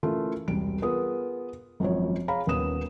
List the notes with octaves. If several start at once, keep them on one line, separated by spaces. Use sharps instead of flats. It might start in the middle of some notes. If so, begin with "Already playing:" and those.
E3 A3 A#3 C#4 F4
E1 C2 G3 D7
B3 F4 G#4 A#4 D#6
G#1 F#2 F3 C#5
G#4 C#5 F5 A#5 B5
D#1 D#2 B3 C#4 D#6 E7